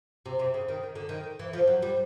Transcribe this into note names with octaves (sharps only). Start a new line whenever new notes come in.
C3
C3
C#3
D#3
D#3
D3
D#3
E3
F3
F#3
G3